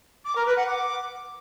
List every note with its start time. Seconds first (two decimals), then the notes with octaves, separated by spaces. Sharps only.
0.24 D6
0.35 A#4
0.45 B4
0.56 F#5
0.66 D6